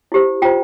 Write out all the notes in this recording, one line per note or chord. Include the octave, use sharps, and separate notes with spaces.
E4 G4 C5
F4 C5 G5 A#5